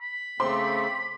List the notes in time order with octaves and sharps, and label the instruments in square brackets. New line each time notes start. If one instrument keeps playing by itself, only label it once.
[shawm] B5
[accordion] C#3 A3 C4 [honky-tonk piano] C5 C6 D6